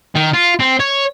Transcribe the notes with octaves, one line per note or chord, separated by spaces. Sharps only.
D#3
F4
C4
C#5